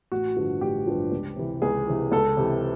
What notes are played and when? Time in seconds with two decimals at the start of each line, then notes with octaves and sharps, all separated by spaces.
0.12 A1 F#4
0.36 G2 D3 F3
0.61 A1 G4
0.87 G2 D3 F3
1.12 C#2
1.36 C3 E3
1.62 C#2 G#4
1.88 C3 E3
2.12 C#2 A4
2.37 C3 E3